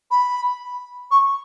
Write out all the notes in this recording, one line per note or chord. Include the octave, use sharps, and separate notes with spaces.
B5
C#6